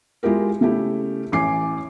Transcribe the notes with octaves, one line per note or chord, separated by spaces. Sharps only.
G#3 E4 F4 G4 A#4
C#3 A3 E4 G4
A1 E4 G#5 D6 C7